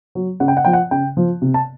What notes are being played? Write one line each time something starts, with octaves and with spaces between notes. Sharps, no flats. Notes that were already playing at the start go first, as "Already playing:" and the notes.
F#3
C#3 F#5
G5
F#5
F3 G5
F#5
C#3 G5
F3
C3
A5